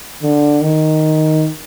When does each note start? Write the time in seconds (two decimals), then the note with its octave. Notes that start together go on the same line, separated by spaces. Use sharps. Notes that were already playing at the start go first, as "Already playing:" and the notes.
0.22 D3
0.63 D#3